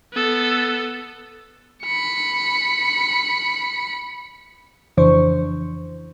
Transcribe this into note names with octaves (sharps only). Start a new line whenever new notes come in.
B3 A4
B5 C#7
F2 C#3 E3 D4 C5 C#6